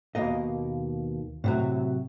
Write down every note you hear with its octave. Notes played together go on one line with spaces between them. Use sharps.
D#2 B2 A#3 D#5
A2 C3 F#3